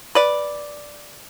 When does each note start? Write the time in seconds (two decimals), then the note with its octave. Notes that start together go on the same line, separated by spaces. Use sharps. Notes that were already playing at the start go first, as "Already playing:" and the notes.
0.15 B4 D5